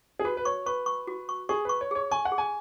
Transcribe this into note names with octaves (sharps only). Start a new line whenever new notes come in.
G#4
F#4 B4
B4
C#5 C#6
B4 C#6
C#6
F#4
C#6
G#4 C#6
B4 C#6
C#5
G#4 C#5
G#5 C#6
F#5
G#4
G#5